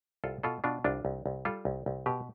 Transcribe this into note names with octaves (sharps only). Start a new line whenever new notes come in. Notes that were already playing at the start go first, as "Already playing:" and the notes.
C2 F4 A4
B2 F4 A4
B2 D4 F4
C2 D4 F4
C2
C2
G3 F4 A4
C2
C2
B2 G4 B4